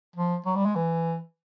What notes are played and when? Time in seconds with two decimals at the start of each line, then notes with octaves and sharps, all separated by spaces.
0.16 F3
0.46 F#3
0.56 G3
0.66 G#3
0.76 E3